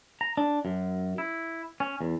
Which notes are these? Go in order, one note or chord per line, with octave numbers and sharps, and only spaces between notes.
A#5
D4
F#2
E4
C#4
E2